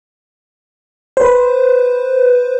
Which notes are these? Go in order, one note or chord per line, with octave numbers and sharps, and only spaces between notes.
B4 C5